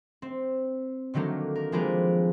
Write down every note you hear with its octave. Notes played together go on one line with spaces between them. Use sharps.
C4
D3 D#3 F#3 A3 A#3
A#4
F3 G#3 A#3 C4 A#4 B4